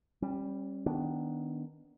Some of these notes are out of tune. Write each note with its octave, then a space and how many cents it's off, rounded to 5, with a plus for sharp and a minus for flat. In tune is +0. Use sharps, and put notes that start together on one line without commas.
G3 +0 C#4 -35
D#3 +0 B3 +0 D4 -20